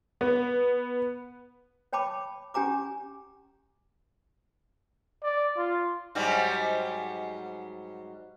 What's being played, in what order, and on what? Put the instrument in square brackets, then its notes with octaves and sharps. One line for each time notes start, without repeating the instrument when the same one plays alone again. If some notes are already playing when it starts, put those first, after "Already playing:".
[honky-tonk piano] B3
[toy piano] C#5 G5 A5 B5 D6
C#4 G4 G#5 A#5 D6
[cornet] D5
F4
[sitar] G#2 F#3 G3